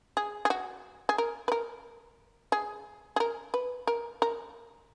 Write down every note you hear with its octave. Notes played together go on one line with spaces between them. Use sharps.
G#4
G#4
F#4
G#4
A#4
B4
A#4
G#4
G#4
A#4
B4
A#4
A#4